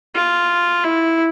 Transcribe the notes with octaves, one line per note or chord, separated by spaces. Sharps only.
F4
E4